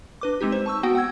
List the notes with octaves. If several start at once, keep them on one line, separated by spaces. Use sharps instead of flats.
D4 B4 D6
G#3 C4 D#4 G4
C5
A5 C#6 E6
B3 F#4 F#5 G5
F#5 G5 E6 G#6